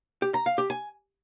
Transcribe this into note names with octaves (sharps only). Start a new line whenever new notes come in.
G4
A#5
F5
G4
G#5